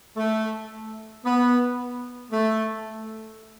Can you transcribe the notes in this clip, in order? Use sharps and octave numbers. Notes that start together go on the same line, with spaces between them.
A3
B3
A3